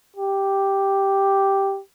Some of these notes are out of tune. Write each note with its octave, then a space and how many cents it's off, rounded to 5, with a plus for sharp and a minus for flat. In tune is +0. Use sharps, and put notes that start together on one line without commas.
G4 +0